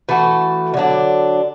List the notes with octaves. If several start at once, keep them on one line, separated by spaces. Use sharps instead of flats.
E3 A3 F#4 A4
D3 F#3 D4